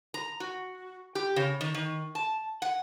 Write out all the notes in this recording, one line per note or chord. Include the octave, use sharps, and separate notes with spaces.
A#5
F#4
G4
C#3
D#3
D#3
A5
F#5